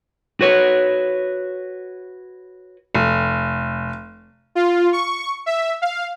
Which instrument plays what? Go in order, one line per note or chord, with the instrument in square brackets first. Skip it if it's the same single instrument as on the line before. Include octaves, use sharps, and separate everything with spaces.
[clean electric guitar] F#4 B4 C#5
[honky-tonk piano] F1
[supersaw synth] F4
C#6
E5
F5